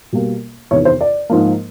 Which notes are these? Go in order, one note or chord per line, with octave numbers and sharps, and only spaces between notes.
B2 G3 A#3
E2 C3 D#3 C#5
C5
D5
G#2 F3 A#3